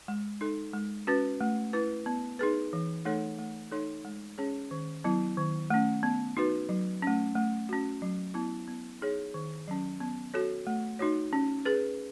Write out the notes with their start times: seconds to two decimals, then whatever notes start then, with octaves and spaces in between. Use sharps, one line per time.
0.08 G#3
0.41 D#4 A4
0.74 G#3
1.07 C#4 F#4 B4
1.41 A3
1.73 E4 B4
2.06 B3
2.39 D#4 G#4 B4
2.73 E3
3.05 A3 D#4 A4 C#5
3.39 A3
3.72 D#4 A4 C#5
4.05 G#3
4.38 C#4 G#4 C#5
4.71 D#3
5.04 F#3 B3 E4
5.37 D#3
5.70 A3 C#4
6.03 B3
6.37 D#4 F#4 B4
6.69 F#3
7.02 A3 C#4
7.35 A3
7.69 C#4 F#4
8.02 F#3
8.34 B3 E4
8.68 B3
9.01 D#4 G#4 C#5
9.34 D#3
9.68 F#3 C#4
10.00 B3
10.34 F#4 A4 C#5
10.67 A3
10.99 D#4 F#4 C#5
11.33 C#4
11.65 G#4 B4